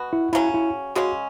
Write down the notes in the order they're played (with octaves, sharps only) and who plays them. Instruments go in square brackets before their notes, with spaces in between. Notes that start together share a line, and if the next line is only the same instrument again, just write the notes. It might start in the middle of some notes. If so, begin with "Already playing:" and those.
Already playing: [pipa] B2 B3 F#4
[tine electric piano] E4
[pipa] C#3 F#3 C#4 [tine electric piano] E4
[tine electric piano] E4
[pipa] C#3 G#3 C#4 [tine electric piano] F#4